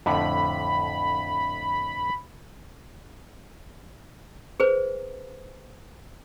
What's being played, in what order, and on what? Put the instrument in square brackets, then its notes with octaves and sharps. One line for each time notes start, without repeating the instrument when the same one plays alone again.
[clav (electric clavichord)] F2 A2 D3 [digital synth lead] B5
[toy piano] G#4 B4 C5